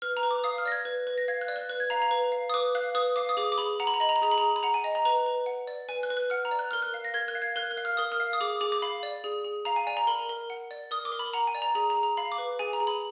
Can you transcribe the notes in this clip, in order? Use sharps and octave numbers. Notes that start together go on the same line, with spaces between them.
B4 F6
A#5
B4
D6
F5 D#6
F6
D5 A#6
G#6
B4
B4
A#6
F5 G#6
F#6
D5
F#6
B4 F#6
G#6
F5 A#5
A#5
B4
F5
D#6
B4 D6
F5 F#6
B4 D#6
F5 D6
D#6
G#4 D6
D6
G#4 B5
F#5 A#5
B5
A#5
D#5 B5
A#5
B5
G#4 A#5
B5
G#4 A#5
B5
F#5 A#5
G#5
D#5
A#5
B4 A#5
B4
F#5
D5
B4 G#5
F#6
B4
F#6
F#5 F6
A#5
D5
F#6
A#4 F6
F#6
F5
A#6
A#4 G#6
F#6
F5
G#6
A#4 F#6
F#6
F5
F6
A#4 D#6
F6
F5
D#6
G#4 D6
G#4 D6
D6
F5 B5
D5
G#4
G#4
F5 A#5
G#5
D5 G#5
A#5
A#4 B5
A#4
F#5
D5
A#4 D#6
D6
A#4
B5
F#5 A#5
G#5
D5
A#5
G#4 A#5
A#5
G#4
A#5
F5 B5
D6
B4
G#4 G#5
A#5
G#4
B5